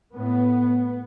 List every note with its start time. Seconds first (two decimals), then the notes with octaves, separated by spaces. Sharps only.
0.14 A2 B3